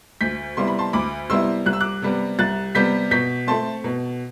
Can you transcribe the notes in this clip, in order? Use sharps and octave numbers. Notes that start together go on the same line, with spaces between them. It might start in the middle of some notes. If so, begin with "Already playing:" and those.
D2 G6 B6
C3 G3 B3 E4 C6
B5
A5 C6
D2 B5 D6
C3 G3 B3 E4 C6 E6
C2 F#6
E6
D6 F#6
C3 G3 B3
C2 F#6 A6
C3 G3 B3 G6 B6
B2 G6 B6
A3 C4 A5 C6
B2